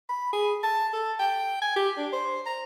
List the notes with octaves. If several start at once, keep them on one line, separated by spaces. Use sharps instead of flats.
B5
G#4
A5
A4
G5
G#5
G4
D4
C5
A#5